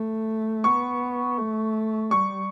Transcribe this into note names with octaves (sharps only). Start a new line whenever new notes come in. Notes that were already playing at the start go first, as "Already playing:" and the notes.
Already playing: A3
B3 C#6
A3
G3 C#6